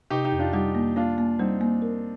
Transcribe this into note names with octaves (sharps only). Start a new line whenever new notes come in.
C3 D#4 G4
D#4 G4
F2
D4 F4
G3 D#4 G4
A#3
A#3 D4 F4
A#3
G3 C4 D#4
A#3
A#4